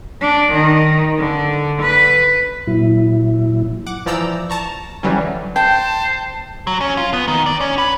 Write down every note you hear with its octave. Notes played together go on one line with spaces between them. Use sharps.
D4
D#3
D3
B4
A#2 F#3 E4
F#5 D6
E3 F3 D5 A#5 E6 G6
A5 A#5 C#6
D3 E3 F#3 G3 C#4
C5 G5 A5
F#3
C#4
F4
B3
D#3
D5
C#4
B4